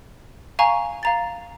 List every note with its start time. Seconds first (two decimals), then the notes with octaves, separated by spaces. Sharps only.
0.59 F5 G#5 A#5 C#6
1.03 F5 A#5 A6